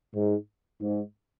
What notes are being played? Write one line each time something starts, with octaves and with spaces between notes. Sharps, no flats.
G#2
G#2